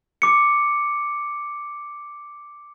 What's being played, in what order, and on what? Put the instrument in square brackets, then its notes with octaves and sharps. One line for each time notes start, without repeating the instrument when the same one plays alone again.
[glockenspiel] D6 C#7